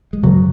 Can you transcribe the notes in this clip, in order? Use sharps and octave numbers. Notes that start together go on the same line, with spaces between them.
G#3
F#2 C#3 F#3